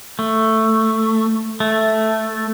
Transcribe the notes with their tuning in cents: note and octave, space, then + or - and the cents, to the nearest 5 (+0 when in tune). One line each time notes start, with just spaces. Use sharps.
A3 +10
A3 +0